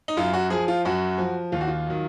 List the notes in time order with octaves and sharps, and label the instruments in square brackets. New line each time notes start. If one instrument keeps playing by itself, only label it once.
[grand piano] D#4
F#2 F4
F#4
F3 G#4
F4
F#2 F#4
F3
D#2 F4
F#4
F4
D#3 F#3